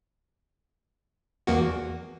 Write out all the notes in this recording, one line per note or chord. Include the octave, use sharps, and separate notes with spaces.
E2 A#3 F#4